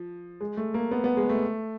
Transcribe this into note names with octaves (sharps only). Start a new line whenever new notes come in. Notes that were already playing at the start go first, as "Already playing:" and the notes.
Already playing: F3
G#3
A3
A#3
B3
B3
G#3
A3